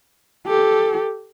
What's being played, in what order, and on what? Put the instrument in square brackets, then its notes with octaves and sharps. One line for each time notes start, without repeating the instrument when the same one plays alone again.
[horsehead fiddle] G4 A4